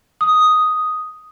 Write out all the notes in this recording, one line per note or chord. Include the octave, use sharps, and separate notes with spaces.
D#6